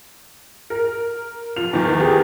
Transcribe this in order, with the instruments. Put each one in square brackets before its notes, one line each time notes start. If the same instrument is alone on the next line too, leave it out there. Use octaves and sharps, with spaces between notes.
[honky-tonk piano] A#4
[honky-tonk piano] F3 F4 [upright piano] F7
[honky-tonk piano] E2 D#3
[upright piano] G4 G#4